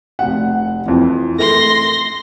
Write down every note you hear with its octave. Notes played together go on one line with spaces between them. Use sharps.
F1 F#5
F2 E3
A3 C6 A#6